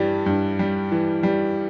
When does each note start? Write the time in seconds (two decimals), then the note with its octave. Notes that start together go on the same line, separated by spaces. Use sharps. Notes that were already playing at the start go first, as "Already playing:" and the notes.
Already playing: G2 E3 G3
0.26 G2
0.59 G3
0.92 E3
1.23 G3